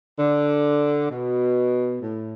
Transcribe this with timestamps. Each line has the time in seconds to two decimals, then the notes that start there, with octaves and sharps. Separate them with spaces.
0.18 D3
1.10 B2
2.02 A2